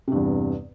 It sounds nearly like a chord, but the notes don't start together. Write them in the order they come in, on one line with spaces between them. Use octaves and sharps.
C3 G2 E2